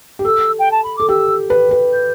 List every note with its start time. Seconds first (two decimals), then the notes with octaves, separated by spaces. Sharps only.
0.19 G4
0.25 A4 E6
0.59 G5
0.71 A5
0.83 B5
0.96 A4 D6
1.09 G4 E6
1.50 B4
1.71 B4
1.92 G6